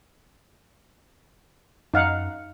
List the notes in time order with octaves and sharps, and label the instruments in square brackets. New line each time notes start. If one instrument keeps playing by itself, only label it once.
[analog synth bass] F#2 [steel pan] D#4 F5 F#5